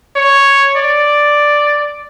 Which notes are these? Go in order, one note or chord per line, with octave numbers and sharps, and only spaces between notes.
C#5
D5